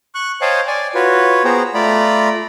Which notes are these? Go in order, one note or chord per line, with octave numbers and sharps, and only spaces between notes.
C#6 F#6
C5 C#5 D#5 F5 G5 A5
D5 G#5
F4 F#4 B4 C#5
B3 G#4 C5 G5 A#5
A3 F4 D5 A#5 B5